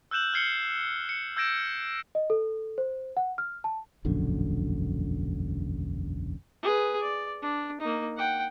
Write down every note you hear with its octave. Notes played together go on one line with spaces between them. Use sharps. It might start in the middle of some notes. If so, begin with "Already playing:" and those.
E6 F#6 G6 E7 F#7
F6 G#6 C7 C#7 G7
C#7
E6 G6 G#6 A#6 D7 E7
D#5
A4
C5
F#5
F6
A5
E1 A#1 F#2 D3
G#4 B4
D5
D4
A#3 D#4
F#5 G5